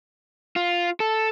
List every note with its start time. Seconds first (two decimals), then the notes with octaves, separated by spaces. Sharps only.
0.56 F4
1.00 A4